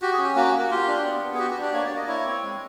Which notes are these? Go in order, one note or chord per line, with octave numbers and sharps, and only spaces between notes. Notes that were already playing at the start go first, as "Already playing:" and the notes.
F#4 G4
G#4
C#4
G4
A#3 F#4
A#3
F#4
F4 G4
D4
B3
B3
G#4
F#4 G4
F#4
D4
G4
A#3 C#5
D5
A#3
D#5
E4 C#5
C4
G#3